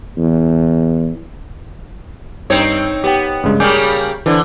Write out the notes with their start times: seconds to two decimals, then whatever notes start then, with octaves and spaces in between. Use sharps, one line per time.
0.17 E2
2.50 G2 C4 D#4 C#5
3.04 B3 G4 G5
3.43 G2 C#3 G#3
3.60 C#3 G3 A#3 G#5 D6 G6
4.26 D3 E3 D4 C5